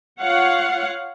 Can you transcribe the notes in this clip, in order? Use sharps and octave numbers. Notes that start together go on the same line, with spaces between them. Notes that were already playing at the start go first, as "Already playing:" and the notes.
F4 C#5 F5 F#5